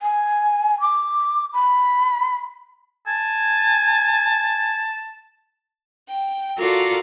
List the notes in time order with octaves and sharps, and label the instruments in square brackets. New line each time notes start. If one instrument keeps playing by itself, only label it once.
[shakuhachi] G#5
D6
B5
[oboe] G#5 [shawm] A5
[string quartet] G5
F4 F#4 A4 A#4 D5 F5